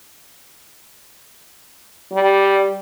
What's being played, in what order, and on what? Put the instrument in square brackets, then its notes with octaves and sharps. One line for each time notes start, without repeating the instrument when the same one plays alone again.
[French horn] G3